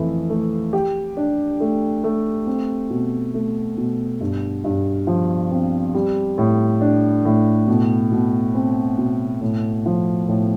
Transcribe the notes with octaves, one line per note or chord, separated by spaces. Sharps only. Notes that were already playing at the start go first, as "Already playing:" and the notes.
Already playing: F2 E3 A3
A3
G4
D4
A3
A3
C4
B2
A3
B2
G2
G2
F3
C4
G3
A2
D4
A2
B2
B2
C4
B2
A2
F3
A2